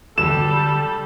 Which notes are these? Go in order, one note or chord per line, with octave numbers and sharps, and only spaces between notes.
D3 G3 A4 E7